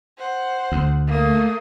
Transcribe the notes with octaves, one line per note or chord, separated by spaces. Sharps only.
C5 F#5
D2
A3 A#3 D#6